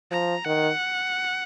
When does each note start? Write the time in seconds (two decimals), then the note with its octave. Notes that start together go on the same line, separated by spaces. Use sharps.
0.11 F3 A#5
0.45 D#3 F#5